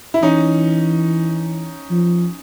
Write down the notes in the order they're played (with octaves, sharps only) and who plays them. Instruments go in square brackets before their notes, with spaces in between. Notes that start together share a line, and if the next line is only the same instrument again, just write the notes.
[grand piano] E4
[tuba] E3 [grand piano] C#4 D#4
[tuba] F3